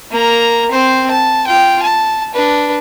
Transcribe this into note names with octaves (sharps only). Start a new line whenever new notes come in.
A#3 A#5
C4 C5
A5
F4 G5
A5
D4 B4